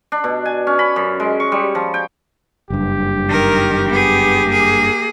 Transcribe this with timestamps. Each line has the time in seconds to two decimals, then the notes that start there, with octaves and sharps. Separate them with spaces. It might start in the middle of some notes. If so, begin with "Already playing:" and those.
0.12 D4
0.24 B2
0.45 G#5
0.67 C#4
0.79 B5
0.96 F#2
1.20 G#3
1.40 C#6
1.52 G3
1.75 F3
1.94 G5
2.70 F#1 G2 G4
3.28 D#3 A#4
3.89 B3 G#4
4.49 A#3 G#4